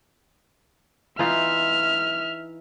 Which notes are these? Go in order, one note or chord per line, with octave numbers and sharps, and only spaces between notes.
E3 D#4 F4 E5 F6